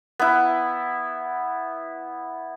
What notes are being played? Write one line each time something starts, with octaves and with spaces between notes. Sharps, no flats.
B3 E4